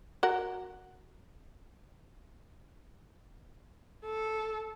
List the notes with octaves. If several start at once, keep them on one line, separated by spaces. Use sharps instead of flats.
F#4 A#4 F#5
A4